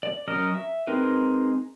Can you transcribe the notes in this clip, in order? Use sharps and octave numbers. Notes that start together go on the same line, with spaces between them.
D5
F#3 C#4 A#4 D#5 F6
E5
G#3 C4 D#4 A#4 B4